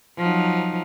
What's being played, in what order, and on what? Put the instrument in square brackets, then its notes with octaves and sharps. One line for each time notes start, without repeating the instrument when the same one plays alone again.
[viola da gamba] F3 F#3 D#4